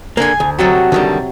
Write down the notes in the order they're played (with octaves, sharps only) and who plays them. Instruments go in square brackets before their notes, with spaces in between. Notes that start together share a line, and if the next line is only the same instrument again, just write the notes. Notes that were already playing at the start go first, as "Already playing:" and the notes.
[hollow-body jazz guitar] D3 A#3 [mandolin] G#4 G#5
[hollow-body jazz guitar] D2
[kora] C3 F#3 [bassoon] F#4 [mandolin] A4 D#5 A#5
[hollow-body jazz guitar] D3 D#3 G3